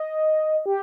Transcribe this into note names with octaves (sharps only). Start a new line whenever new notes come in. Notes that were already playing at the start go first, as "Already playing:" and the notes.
Already playing: D#5
G4